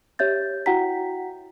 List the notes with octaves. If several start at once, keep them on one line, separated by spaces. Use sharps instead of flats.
G4 C#5 E5 G6 A6
E4 F#4 F#5 G5 A#5 B6